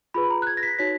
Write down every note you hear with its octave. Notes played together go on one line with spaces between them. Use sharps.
F4 G#4 B4 B5
A#5
F#6
G#6
A#6
B6
D#4 F#4 C#5 B6